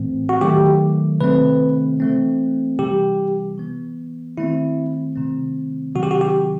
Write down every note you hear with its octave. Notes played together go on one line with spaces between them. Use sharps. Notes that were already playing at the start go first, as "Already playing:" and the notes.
Already playing: A2 E3 A3 C4
F#4
D#3 F#3 A3 G4
C3 D#3 A3 C4 B4
E3 A3 C4
C3 E3 G3 G4
E3 B3
D#3 A3 C4 E4
C3 D#3 A3 C4
C3 D#3 F#3 F#4
G4
F#4
G4